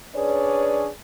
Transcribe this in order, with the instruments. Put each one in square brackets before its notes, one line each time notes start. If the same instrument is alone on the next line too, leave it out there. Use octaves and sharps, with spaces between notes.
[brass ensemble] C#4 D4 G#4 B4 C#5 D5